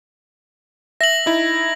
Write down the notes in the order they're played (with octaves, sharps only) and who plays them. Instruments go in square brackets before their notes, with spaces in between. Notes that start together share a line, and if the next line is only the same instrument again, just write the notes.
[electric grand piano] E5 [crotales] A#6 F#7
[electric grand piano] D#4 E4